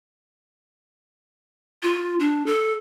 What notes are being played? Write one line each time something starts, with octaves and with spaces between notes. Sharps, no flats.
F4
D4
A4